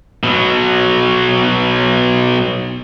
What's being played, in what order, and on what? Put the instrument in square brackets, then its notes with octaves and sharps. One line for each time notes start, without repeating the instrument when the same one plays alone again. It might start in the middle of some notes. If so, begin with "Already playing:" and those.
[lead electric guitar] B2 F#3